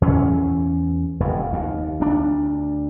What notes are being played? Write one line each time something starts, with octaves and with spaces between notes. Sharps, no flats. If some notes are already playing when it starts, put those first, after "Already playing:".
E2 C#4
F1 F2
D#2
D2 D4